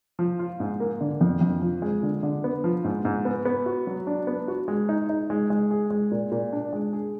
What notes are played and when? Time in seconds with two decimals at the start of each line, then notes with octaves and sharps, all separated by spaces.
0.19 F3
0.39 F4
0.60 G#2
0.80 A#3
1.01 D3
1.21 F2
1.41 F2
1.62 F3
1.82 G#3
2.03 D3
2.23 D3
2.44 B3
2.64 F3
2.84 G#2
3.05 G#2
3.25 B3
3.45 B3
3.66 F#4
3.87 F#3
4.07 D4
4.27 B3
4.48 F#4
4.68 G#3
4.89 D#4
5.09 D#4
5.30 G#3
5.50 G#3
5.71 G#4
5.91 G#3
6.11 A#2
6.32 A#2
6.53 D4
6.73 G#3
6.93 G#4